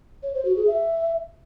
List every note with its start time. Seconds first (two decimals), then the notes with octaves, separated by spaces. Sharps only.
0.23 C#5
0.34 C5
0.45 F#4
0.56 G#4
0.67 E5